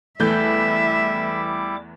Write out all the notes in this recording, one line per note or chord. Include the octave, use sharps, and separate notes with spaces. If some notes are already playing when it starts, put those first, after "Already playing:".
E2 E3 G3 A3 E4 E5 D6 G6